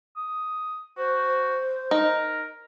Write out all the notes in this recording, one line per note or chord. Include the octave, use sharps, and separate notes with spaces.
D#6
F#4 C5
D#4 A#4